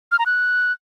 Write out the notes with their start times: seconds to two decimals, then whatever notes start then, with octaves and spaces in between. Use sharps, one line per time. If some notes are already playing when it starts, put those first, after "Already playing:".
0.12 F6
0.19 A#5
0.26 F#6